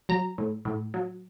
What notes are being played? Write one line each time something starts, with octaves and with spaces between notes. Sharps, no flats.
F#3 A#5
A2
A2
F#3